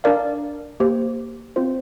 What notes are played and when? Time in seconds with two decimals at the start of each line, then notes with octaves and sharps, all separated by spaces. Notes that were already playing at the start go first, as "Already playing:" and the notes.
0.04 D4 A#4 D5 F5
0.80 A#3 G4 C5
1.56 C4 F4 C5